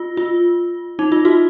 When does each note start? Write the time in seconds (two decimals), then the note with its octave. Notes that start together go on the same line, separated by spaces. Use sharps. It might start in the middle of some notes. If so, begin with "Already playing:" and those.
Already playing: F4
0.17 F4
0.99 D#4
1.12 F4
1.25 F#4